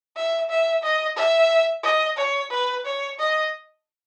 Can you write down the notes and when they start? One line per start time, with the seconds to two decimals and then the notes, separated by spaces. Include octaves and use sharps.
0.16 E5
0.49 E5
0.83 D#5
1.16 E5
1.83 D#5
2.17 C#5
2.50 B4
2.85 C#5
3.18 D#5